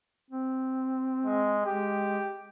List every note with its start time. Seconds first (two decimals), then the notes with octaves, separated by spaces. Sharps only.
0.30 C4
1.25 G#3
1.66 G#3 G4